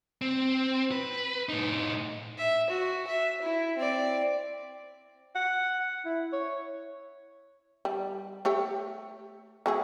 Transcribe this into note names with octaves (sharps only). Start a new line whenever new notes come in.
C4
B4
A2 D#4
E5
F#4
E5
E4
C4 D5
F#5
E4
C#5
G3
A3 G4 C#5
F#3 A3 G#4